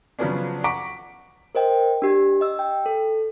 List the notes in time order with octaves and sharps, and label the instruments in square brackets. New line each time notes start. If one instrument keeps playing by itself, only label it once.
[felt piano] C#3 F3 F#3 B3 C#4 D4
F#5 A#5 C#6 D6 B6 D7
[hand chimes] A#4 C5 D#5 G5
D4 G4
D#5 E6
G5
A4